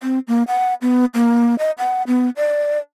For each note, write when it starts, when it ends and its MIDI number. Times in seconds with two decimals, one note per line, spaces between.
0.03 0.19 60
0.28 0.43 58
0.48 0.74 78
0.82 1.05 59
1.14 1.55 58
1.59 1.71 75
1.78 2.03 78
2.07 2.30 59
2.37 2.79 74